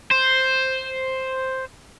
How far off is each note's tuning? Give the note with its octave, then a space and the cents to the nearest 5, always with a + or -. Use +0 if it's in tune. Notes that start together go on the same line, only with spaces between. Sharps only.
C5 +5